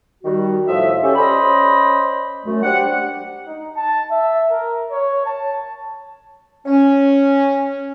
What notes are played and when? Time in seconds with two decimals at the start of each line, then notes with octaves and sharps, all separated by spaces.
0.24 D#3 G3 F#4
0.67 A2 F3 D#5 E5
1.02 C#4 G4 A4
1.16 C#4 C5 D5 D#5 B5
2.45 F#2 A3
2.63 D4 G4 C5 F#5
3.47 D#4
3.76 A5
4.11 E5
4.51 A#4
4.91 C#5
5.26 A5
6.66 C#4